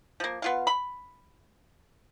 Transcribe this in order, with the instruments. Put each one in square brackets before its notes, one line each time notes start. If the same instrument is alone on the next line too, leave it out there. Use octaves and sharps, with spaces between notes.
[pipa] F3 A#3
B3 F4 F5
B5